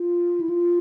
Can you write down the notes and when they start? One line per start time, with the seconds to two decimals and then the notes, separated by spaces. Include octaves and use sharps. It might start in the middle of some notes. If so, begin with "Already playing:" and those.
Already playing: F4
0.41 E4
0.49 F4